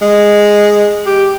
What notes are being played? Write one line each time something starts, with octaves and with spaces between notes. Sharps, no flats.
G#3
G4